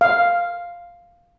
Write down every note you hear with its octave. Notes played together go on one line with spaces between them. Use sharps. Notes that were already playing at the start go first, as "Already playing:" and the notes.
F5